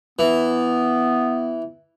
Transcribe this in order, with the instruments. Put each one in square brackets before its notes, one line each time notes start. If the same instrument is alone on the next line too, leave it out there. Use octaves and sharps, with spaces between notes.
[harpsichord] E3 [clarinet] B3